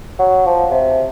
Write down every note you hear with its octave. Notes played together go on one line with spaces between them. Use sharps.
F#3
F3
C3